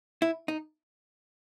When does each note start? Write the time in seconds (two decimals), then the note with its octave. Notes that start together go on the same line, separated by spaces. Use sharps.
0.22 E4
0.48 D#4